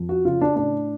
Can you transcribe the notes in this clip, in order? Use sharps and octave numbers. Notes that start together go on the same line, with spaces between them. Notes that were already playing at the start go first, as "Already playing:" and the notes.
Already playing: F2
F#4
C#3 F4
D4
A2 D4